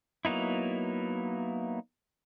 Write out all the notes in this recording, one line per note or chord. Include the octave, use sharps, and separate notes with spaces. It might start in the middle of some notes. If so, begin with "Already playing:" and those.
F#3 A#3 B3 D#4 E4